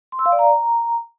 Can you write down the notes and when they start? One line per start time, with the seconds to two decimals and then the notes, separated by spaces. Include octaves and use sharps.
0.12 C6
0.19 E6
0.26 F5
0.32 D5
0.39 A#5